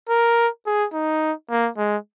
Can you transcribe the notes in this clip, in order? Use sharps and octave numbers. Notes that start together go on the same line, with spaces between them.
A#4
G#4
D#4
A#3
G#3